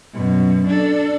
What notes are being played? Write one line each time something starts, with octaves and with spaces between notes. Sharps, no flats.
F#2 B2
D4 A4